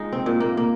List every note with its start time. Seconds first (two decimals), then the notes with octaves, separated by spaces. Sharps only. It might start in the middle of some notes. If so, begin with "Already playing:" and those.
Already playing: G#3 D#4 F4
0.12 C4
0.26 A#2
0.40 A#3
0.57 A#3